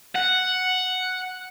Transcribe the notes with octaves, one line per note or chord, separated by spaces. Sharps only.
F#5